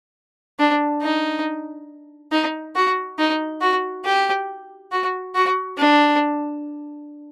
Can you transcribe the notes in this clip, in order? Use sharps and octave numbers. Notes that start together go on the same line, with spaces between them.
D4
D#4
D#4
F#4
D#4
F#4
G4
F#4
F#4
D4